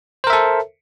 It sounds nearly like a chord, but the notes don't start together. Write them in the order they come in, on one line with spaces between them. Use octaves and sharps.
C5 A#4 E5 A4